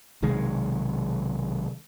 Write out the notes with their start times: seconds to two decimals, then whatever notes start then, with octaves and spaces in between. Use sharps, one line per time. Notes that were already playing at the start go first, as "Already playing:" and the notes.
0.22 B1 C3 D#3 G#3